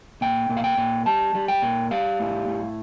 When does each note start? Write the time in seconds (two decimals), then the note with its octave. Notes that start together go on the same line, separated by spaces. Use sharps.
0.21 A#2 G5
0.49 A#2
0.57 F5
0.64 G5
0.77 A#2
1.06 G3 A5
1.35 G3
1.48 G5
1.62 A#2
1.91 G3 F5
2.20 A2
2.47 A2